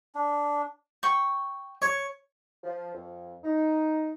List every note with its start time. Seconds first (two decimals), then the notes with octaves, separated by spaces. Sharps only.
0.15 D4
1.03 G5 C#6
1.82 C#5
2.64 F3
2.93 F2
3.44 D#4